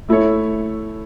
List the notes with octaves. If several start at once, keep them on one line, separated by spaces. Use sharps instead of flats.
A3 E4 A4 C#5